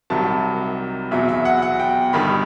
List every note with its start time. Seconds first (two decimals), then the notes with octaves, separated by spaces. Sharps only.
0.10 C2 C3 D#3 F#3 A5
1.11 E2 B2 F#3 E5
1.29 E5
1.45 F#5
1.62 F#5
1.80 G5
2.13 G1 G2 D#3 B5